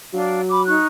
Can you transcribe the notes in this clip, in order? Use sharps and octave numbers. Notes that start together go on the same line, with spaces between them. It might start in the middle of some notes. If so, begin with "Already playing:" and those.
F#3 D4 F5
B5 D6
D#4 C#6 F#6